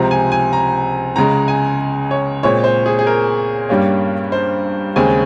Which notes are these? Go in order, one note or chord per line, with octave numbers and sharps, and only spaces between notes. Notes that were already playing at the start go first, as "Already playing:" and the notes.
Already playing: C#2 C3 F3 C4 A#5
G#5
G#5
A#5
C#2 C#3 G#3 A#5
G#5
C#5
A#2 G#3 C4 C#5
C5
G#4
G#4
A#4
G2 G3 A#3 C#4
C5
D#2 C#3 G#3 C4 G#5